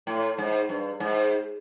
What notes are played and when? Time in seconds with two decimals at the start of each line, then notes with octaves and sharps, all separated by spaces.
0.07 A2
0.38 G#2
0.69 G2
1.00 G#2